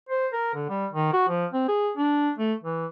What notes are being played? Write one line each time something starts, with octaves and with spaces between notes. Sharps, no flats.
C5
A#4
D3
G3
D#3
F#4
F3
C4
G#4
D4
A3
E3